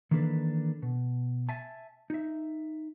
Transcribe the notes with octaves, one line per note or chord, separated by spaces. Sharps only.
D#3 E3 A#3 D4 A4 B4
B2
E5 G#5 A5
D#4 E5